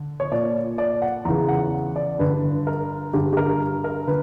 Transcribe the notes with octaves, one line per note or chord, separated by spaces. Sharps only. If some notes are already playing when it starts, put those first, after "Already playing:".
Already playing: D3
C#5
A#2 D5
D5
F#5
E2 C#3 E3 A#5
F#5
D5
G2 D3 B4
A#4
G2 D3 G4
G4
A#4
A#4
D3 B4